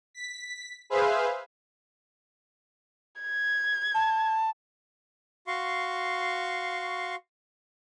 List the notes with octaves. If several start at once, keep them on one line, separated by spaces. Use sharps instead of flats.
B6
G#4 B4 C5 E5 F5
G#6
A5
F#4 F5 C6 C#6